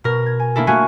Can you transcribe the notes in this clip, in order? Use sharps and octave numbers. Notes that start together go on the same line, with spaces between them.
B2 A#4
G#6
G#5
A3 A#3 D4 E4 A4
A3 A#3 F4 F#4 G#5